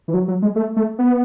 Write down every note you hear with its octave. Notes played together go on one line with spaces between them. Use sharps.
E3
F#3
F#3
G#3
A3
A3
B3